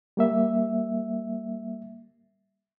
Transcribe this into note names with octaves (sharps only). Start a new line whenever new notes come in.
G3 A#3 E5